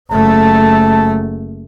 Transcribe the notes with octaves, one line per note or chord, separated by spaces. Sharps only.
F#1 A3 A5